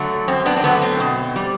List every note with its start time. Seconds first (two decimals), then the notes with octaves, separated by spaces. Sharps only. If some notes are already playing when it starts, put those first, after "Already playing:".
Already playing: D3 F#3 A3
0.28 F#2 C4
0.46 B3 D4
0.57 C4
0.64 D3 F#3 A3 B3
0.82 C4
1.00 B2
1.36 G3